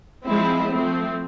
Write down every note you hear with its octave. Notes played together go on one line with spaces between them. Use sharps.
F3 G#3 C4 E4
F3 A3 C4